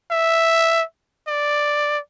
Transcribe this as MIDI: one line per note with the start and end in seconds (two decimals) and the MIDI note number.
0.12 0.83 76
1.28 1.99 74